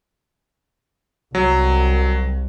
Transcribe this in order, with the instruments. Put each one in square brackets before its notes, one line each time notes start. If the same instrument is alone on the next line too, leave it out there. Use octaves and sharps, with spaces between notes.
[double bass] C2 [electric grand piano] F#3